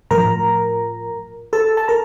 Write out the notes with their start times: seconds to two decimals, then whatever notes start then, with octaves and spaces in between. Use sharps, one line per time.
0.11 A2 F3 A#4 A#5
1.53 A4 A5
1.77 A5
1.88 A#4 A#5